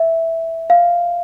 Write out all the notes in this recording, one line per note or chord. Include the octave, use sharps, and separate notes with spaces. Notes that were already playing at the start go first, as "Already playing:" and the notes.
Already playing: E5
F5